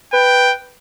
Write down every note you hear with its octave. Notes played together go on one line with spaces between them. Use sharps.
B4 G5